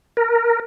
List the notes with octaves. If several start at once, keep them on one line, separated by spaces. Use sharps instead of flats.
A#4